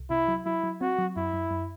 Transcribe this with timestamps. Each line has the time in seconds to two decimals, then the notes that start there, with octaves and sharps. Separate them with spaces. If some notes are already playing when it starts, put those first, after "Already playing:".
Already playing: C2
0.10 C3 E4
0.28 F#3
0.46 F#3 E4
0.64 F#3
0.81 C4 F#4
0.99 F#3
1.16 F#2 E4
1.34 F#2
1.51 F#2